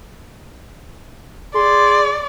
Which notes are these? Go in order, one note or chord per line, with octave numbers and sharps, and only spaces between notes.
G#4 D5 C6